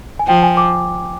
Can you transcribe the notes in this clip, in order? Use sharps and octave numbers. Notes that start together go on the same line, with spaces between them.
G#5
F3 G5
G#5
D6